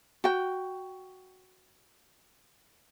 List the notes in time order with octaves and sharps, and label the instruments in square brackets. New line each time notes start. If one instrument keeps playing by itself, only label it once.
[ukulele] F#4 G5